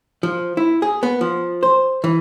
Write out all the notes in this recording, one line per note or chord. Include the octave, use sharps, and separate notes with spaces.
F3
E4
G#4
B3
F3
C5
E3